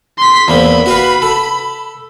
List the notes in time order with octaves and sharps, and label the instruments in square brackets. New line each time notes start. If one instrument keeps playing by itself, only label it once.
[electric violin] C6 B6
[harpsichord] E2 A#3 C4 [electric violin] B5
[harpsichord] F#4 B4 F5
A4